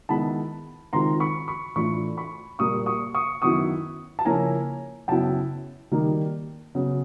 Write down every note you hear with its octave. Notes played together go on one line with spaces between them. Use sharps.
D#3 G#3 B3 E4 A5 B5
D#3 G#3 C4 F4 A#5 C6
B5 C#6
B5 C#6
A2 E3 A3 D4 F4 B5 C#6
B5 C#6
A#2 G3 A#3 C#6 D#6
C#6 D#6
C#6 D#6
F#2 D#3 F#3 B3 E4 C#6 D#6
A5
C#3 F3 A#3 C#4 E4 G#5 A#5
F#2 C#3 F#3 B3 E4 G5 A5
D#3 G3 A#3 D#4
C#3 F#3 B3